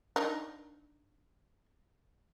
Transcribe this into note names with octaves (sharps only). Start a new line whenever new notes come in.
D4 D#4 A#4